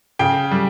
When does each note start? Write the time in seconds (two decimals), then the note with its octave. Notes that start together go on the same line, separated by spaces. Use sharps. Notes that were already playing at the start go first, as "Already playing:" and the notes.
0.19 C#3 G5
0.51 G3